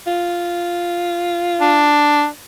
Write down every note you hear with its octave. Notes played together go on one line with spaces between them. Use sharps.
F4
D4